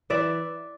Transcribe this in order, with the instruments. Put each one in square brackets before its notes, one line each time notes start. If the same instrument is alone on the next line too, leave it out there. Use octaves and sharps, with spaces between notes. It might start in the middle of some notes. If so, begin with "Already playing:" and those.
[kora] E3 D5 E5